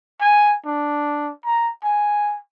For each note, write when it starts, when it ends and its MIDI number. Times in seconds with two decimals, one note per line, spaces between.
0.21 0.55 80
0.66 1.31 62
1.46 1.70 82
1.84 2.37 80